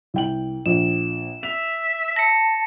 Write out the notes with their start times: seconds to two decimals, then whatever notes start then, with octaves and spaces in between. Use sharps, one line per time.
0.14 C2 G5 F#7
0.66 A#1 E7
1.43 E5 F7
2.16 A5 A#6 C#7